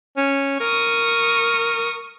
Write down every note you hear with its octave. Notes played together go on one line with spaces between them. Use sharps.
C#4
A#4 C#6 D#6